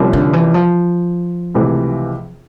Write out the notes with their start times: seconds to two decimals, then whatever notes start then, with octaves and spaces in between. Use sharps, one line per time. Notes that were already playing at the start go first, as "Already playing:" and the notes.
Already playing: C2 C3 F3 A#3 C#4
0.13 D3
0.33 E3
0.54 F3
1.54 C#2 C3 E3 A3